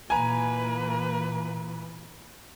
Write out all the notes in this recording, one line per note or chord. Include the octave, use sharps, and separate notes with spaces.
A#2 E3 A#3 B4 G#5 A#5